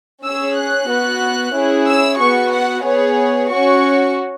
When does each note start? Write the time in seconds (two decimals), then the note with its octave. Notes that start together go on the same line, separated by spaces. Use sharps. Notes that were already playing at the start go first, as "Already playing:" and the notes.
0.24 C#4 G#4 E6
0.57 F#6
0.90 B3 F#4
1.55 C#4 E4 G#4
1.87 E6
2.19 B3 F#4 C#6
2.53 F#5
2.85 B3 G#4 C#5
3.50 C#4 F#4 C#6